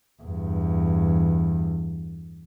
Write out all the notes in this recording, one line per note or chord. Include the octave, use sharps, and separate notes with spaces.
E2 G2